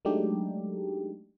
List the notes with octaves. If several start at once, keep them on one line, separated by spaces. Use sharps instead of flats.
F#3 G#3 A3 D4 D#4 G4